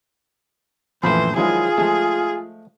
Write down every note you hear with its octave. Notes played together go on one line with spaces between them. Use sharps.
A#1 F#2 E3 F3 A3 C5 B5
D#3 F3 F#3 G#3 E4 F4 G#4
F3 G#3 A3